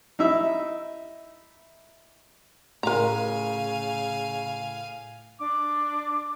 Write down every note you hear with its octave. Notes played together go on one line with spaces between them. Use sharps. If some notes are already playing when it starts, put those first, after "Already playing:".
D#4 E4 E5
A2 C#3 A#4 F5 G#5 A#5
D4 D6